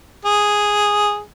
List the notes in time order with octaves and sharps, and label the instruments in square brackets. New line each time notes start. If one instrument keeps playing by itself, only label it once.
[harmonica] G#4